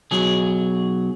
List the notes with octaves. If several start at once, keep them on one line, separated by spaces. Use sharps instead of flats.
B1 F#3 G#4